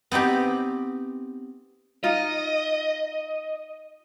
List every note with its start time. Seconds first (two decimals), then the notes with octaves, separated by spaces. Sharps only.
0.12 B3 C4 D#4 G4
2.04 D#4 F4 D#5